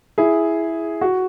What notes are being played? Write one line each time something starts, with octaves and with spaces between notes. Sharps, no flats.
E4 G#4
F#4